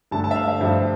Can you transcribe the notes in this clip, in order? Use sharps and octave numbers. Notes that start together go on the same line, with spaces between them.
G2 D3 A3 A5
A5
E5
F5
E5
G2 F3 A3 C5